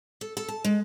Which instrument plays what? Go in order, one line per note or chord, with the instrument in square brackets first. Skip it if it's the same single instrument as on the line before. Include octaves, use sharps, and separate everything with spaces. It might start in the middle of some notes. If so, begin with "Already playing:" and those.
[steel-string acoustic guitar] A4
A4
A5
G#3